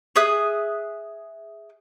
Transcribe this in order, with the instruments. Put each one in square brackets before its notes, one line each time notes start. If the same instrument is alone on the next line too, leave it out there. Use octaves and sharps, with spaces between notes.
[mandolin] G#4 E5 D#6 F#6